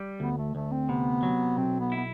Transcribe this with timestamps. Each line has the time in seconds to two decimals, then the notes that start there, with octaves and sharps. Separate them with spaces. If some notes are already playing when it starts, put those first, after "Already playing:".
Already playing: G3
0.20 D2 B3
0.37 A3
0.55 D2 A3
0.71 C4
0.89 C3 B3
1.23 F#3
1.57 B1 C4
1.80 B3
1.92 B3 E4